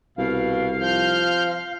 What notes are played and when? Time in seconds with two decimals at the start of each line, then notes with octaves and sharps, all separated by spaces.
0.18 C2 B2 F5
0.80 F3 F6 G6